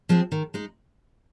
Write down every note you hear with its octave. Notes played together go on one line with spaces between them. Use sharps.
F3 G#3 C4
D#3
G#3 D#4